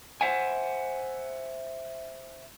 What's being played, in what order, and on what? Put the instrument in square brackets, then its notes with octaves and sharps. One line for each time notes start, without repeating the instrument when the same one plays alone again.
[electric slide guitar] C5 E5 F#5 G#5